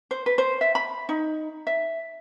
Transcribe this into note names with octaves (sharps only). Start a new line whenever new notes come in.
C5
B4
C5
E5
B5
D#4
E5